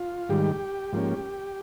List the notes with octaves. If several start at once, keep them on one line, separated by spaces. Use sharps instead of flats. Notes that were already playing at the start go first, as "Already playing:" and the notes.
Already playing: F4
G#2 D#3 G3 G4
G#2 F3 A#3 C#4